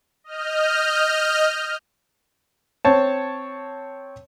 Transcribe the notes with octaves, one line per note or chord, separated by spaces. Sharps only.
D#5 F6 G6
C4 C#5 A5